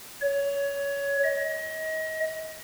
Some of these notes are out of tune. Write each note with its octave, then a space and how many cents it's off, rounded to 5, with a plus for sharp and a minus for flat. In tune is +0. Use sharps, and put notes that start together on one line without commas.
C#5 +20
D#5 +30